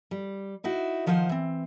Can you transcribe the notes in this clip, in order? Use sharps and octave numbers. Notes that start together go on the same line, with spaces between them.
G3
D#4 E4 F#4
D#3 F3 E4 F4 C5 F#5
E3 C4